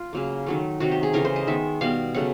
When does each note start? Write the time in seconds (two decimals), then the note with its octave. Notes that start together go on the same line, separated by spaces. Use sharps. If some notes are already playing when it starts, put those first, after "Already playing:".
Already playing: F4
0.13 C#3 F#3 A#3
0.46 D#3 F#3 A3
0.80 C3 D#3 F#3 F#4
0.91 G4
1.03 G#4
1.13 C#3 E3 A3 A#4
1.25 C5
1.36 D#5
1.47 D#3 G#3 B3 E5
1.81 B2 G3 B3 F5
2.14 C#3 F#3 A3 F#5